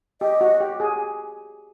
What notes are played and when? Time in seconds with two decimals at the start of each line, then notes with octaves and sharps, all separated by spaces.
0.21 G4 D#5
0.41 F#4
0.60 G4
0.80 G#4